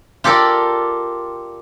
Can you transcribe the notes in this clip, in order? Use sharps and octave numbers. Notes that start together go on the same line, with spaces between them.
F4 G4 A4 A#4 D5